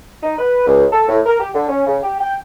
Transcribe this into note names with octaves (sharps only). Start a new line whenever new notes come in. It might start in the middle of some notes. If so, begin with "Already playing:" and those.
D#4
B4
C#2
A4
A2
A#4
G4
D3
C#4
C#3
G4
G5